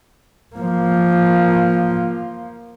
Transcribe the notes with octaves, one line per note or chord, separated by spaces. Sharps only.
F3 A#3